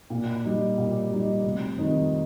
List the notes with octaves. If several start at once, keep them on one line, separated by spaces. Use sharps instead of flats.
A#2
G3 D#4
A#2
G3 D#4
F1
F2 D#3 G3 D#4